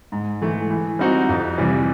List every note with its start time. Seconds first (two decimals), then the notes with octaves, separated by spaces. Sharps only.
0.12 G#2
0.42 E3 A3
0.70 E3
0.99 G3 C4 D#4 F#4
1.29 F2
1.58 C3 E3 G3